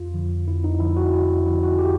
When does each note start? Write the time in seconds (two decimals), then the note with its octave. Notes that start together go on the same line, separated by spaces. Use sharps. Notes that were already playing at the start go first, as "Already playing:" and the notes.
Already playing: F2 F4
0.14 D3 F3
0.48 F2 E4
0.64 D#4
0.80 D3 F3 E4
0.97 F#4
1.13 F2 E4
1.46 D3 F3 E4
1.63 F#4
1.79 G4